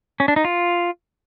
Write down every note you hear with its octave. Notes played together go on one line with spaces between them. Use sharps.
C#4
D4
D#4
F4